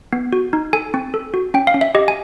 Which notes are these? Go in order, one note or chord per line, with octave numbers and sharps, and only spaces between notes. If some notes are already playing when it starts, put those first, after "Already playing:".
B3
F#4
D#4
A4 G#5
C4
A4
F#4
C#4 G5
F5
C#4
E5
G4 D#5
G#5